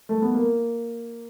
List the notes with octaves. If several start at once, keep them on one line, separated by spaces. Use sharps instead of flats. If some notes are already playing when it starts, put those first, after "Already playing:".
A3
B3
A#3